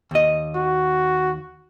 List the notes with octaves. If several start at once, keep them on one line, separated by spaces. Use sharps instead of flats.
D#2 D#5
F#4